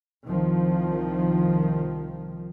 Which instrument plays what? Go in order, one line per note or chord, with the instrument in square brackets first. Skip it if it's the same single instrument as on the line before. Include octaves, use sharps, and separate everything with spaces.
[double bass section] C2 D#3 F3